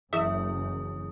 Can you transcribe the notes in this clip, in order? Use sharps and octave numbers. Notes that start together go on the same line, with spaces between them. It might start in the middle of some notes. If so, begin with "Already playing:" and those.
F#1 F#2 E3 E4 G#4 E5 D#6